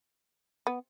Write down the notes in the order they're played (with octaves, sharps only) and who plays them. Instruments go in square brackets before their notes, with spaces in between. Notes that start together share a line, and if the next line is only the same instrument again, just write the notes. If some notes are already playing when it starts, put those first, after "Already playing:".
[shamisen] B3